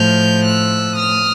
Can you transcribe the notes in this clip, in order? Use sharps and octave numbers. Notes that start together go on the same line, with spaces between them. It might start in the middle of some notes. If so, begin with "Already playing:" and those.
Already playing: A2 F3 F6 G6
E6 F#6
D#6 F6